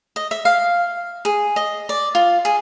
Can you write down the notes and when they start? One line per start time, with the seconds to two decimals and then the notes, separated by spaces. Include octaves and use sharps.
0.16 D#5
0.31 E5
0.45 F5
1.25 G#4
1.56 D#5
1.89 D5
2.15 F4
2.45 G#4